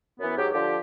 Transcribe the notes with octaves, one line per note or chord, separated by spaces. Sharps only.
F#2 E3 B3
G#2 F#3 G4
D3 F3 G4